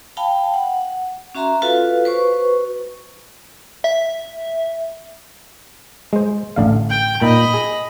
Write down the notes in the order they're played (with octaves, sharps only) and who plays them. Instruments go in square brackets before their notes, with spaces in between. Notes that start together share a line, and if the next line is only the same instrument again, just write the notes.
[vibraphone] F5 G5 A5 B5
F#5
C#4 F#4 E5 A#5 C6
F4 F#4 A4 B4 F5
F#4 B4 C5 C#6
[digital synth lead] E5
[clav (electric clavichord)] G#3 C5
A1 D3 F5
[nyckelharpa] G5
[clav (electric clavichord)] A#2 D#4 [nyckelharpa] D#5 B5
[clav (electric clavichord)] G#4